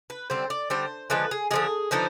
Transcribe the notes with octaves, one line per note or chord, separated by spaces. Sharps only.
B4
D3 G3 C4 C5
D5
D3 G3 C4 C5
D3 F3 G#3 B4
G#4
D3 F3 G#3 G#4
D3 F3 B3 D#4 C5